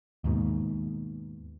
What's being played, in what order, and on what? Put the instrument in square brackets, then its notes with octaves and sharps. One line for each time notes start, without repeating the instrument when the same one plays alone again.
[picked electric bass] D#2 G#2 B2